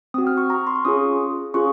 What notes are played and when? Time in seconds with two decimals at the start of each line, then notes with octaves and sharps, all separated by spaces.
0.14 C4 D#6
0.18 F#4
0.27 F6
0.38 C#6
0.50 A#5
0.67 C6
0.76 C#6
0.85 C#4 F4 G#4 D#6
1.54 C#4 F4 G#4 C#6